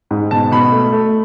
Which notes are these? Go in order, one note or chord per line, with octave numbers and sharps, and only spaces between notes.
G#2
B2 A5
B2 B5
A3
A3